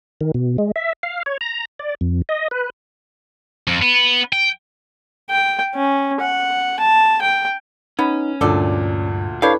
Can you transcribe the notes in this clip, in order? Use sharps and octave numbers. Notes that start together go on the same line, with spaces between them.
D#3
B2
G#3
E5
F5
C#5
A#5
D5
F2
D#5
B4
F2
B3 B4
G5
G5
C#4
F#5
A5
G5
B3 C#4 D#4
D2 G2 A#2 A4 D5
G3 D4 E4 A4 B4 C#5 F5